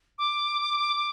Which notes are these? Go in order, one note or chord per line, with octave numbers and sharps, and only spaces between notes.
D6